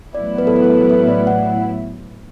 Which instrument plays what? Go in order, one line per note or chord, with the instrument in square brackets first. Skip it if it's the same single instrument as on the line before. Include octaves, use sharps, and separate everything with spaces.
[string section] A1 A2 F#3 B3 E4 [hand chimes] D5
[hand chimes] B4
A4
B4
A4
B4
D5
F#5